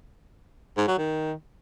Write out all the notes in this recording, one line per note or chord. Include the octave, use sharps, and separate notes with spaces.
G#2
F#3
D#3